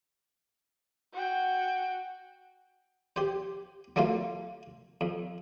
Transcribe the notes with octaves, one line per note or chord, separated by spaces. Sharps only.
F#4 G5
G4 C5
F#3 A3 A#3 F4 F5
F2